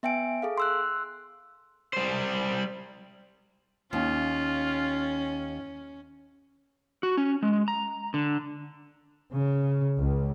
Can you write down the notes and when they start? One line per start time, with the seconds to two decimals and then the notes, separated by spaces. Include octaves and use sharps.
0.03 B3 E5 G5 G#5 D7
0.42 G#4 A4 F5
0.58 C6 E6 F#6
1.93 G3 C5
3.93 D#2 C#4 F4
7.03 F#4
7.17 C#4
7.43 G#3
7.68 A#5
8.14 D3
9.33 C#3
9.98 C#2